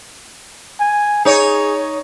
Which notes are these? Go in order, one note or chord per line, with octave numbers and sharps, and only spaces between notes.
G#5
D#4 G#4 C#5